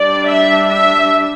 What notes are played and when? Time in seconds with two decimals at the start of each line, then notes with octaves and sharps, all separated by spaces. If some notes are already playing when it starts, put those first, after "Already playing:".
Already playing: G3 D4 D5
0.29 E5
0.69 E5